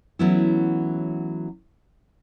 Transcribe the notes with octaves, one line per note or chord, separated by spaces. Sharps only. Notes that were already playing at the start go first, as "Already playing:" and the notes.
E3 F#3 A3 B3 C#4 E4